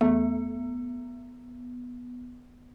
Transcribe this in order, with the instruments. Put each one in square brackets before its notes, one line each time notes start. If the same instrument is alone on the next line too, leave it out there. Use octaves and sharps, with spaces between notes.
[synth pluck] E2 A3 [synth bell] B3